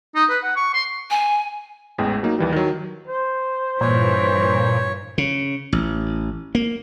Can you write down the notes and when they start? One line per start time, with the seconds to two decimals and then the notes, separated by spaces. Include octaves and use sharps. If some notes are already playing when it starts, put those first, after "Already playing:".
0.15 D#4
0.29 B4
0.43 F#5
0.56 C#6
0.74 C6
1.10 G#5
1.98 A1 E2 G#3 G#4 G5
2.23 F#3 A#3 D#4
2.39 D#2 E3 G3
2.52 D#3 F#3
3.07 C5
3.81 G2 A#2 E3 C#5
5.18 C#3
5.72 A1
6.55 A#3